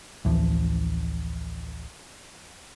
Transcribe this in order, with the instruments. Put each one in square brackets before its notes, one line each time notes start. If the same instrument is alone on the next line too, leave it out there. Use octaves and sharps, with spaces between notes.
[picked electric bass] A1 D2 E3 F3